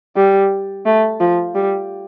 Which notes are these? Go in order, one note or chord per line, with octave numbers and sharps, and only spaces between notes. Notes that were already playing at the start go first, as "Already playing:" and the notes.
G3
A3
F3
G3